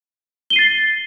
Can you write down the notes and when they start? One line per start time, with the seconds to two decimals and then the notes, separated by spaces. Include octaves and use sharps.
0.50 G7
0.53 D#7
0.56 C7
0.59 A6